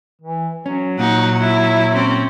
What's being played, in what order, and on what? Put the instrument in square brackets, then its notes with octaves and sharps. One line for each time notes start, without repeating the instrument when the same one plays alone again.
[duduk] E3
[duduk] F#3 [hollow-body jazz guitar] C#4
[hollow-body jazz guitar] A#2 [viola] D#4 F#5
[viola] E4
C4 C#4